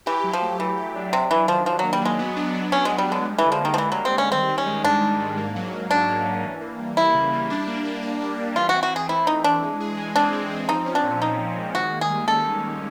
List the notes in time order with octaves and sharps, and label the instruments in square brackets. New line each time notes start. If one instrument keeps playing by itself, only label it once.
[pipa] E3 [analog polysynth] G4
[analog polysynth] F#3
[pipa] F3
[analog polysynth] A3
[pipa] E3 [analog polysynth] G4
[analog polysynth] G4
D4
[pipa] C3 [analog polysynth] F#3
[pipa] E3 [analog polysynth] F#3
[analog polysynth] D#3 [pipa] F3
[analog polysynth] D#3 [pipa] F3
[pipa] F#3 [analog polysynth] A#3
[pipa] G3
[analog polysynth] F#3 [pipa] G#3
[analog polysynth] B3
D4
D4
[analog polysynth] B3 [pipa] C#4
[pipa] G#3 [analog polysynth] D4
[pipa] G3
[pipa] D3 [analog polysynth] G#3
[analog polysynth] G3
[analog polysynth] D3 [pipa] E3
[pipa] F3
[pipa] D#3 [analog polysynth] A#3
[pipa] F3
[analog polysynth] D3 [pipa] E3
[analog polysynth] D3 [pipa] F#3
[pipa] C4
[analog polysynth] G3 [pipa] C#4
[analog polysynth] D#3 [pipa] C4
[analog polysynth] D#3
[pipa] C#4
[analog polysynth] G#3
[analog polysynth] G#2 [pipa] D4
[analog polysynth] G#3
G#2
A#3
F#3
F#3
[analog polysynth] C#4 [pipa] D4
[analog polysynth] A#3
C#4
E3
A#3
G3
[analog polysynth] A#3 [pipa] E4
[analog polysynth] C#3
G3
D4
A#3
A#3
A#3
D4
G3
[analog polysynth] E3 [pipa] F4
[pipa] F#4
[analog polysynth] C4
[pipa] F#4
[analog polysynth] E3 [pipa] G#4
[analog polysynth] A3 [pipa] E4
[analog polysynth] A3 [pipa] D#4
[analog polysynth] E3 [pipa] D4
[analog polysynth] G#3
G#4
G#3
[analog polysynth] C4 [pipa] D4
[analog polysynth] G#3
C4
[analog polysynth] F3 [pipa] D#4
[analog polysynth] C#4
[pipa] D4
[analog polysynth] A#2
[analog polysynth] C#4 [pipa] D#4
[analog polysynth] F3
G#3
[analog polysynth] D#3 [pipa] F#4
[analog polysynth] A#3
[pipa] G#4
[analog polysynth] G3
[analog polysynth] C#4 [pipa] A4